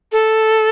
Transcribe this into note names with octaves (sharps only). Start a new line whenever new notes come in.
A4